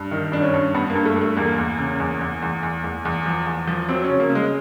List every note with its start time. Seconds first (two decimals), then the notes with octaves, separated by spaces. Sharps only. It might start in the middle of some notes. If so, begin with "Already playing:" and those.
Already playing: G2
0.11 D#3
0.32 G2 D4
0.42 C#4
0.53 G2
0.74 G2 B3
0.90 A#3
0.95 G2
1.05 A3
1.16 G2
1.21 A3
1.37 E2 A#3
1.58 E2
1.79 C#3
2.00 E2
2.21 E2
2.42 E2
2.63 E2
2.84 E2
3.05 E2
3.26 F3
3.46 E2
3.67 F3
3.89 F#3 C4
4.04 C#4
4.10 C#3
4.20 A#3
4.30 C#3
4.35 G#3